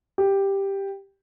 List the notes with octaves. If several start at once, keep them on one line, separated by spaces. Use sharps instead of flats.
G4